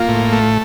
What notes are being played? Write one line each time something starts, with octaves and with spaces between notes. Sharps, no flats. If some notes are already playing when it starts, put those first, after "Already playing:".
Already playing: A#3 F4
A2
A3